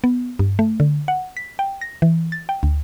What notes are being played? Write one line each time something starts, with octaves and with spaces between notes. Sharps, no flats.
B3
G2
A3
D3
F#5
B6
G5
A#6
E3
A6
G5
D2